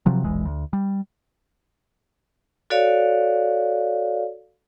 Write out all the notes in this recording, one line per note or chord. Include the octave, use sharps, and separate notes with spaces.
C3 F3 F#3
E1 A#1 E3 G#3
D2
G3
F#4 A4 C#5 D5 F5